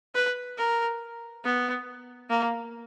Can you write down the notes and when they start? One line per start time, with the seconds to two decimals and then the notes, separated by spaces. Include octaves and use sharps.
0.15 B4
0.58 A#4
1.45 B3
2.30 A#3